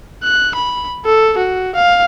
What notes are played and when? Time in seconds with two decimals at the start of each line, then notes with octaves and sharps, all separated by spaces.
0.24 F#6
0.56 B5
1.06 A4
1.38 F#4
1.75 F5